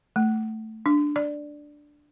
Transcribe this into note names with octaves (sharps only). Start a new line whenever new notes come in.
A3
D4
D5